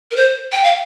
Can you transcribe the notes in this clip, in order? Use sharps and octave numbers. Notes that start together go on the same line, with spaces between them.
A#4
C5
G5
F5